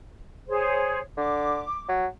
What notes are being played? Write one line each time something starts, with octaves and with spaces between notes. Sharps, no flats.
G#4 C5 C#5
D3 D6
F#3